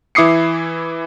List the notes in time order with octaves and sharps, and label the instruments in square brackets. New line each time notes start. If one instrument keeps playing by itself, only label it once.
[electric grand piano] E3 E4 D6 D#6 C7 C#7